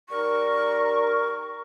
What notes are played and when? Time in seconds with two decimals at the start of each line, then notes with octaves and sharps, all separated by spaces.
0.09 G3 D#4 A#4 C#6